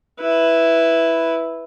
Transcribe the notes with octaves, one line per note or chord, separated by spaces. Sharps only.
E4 B4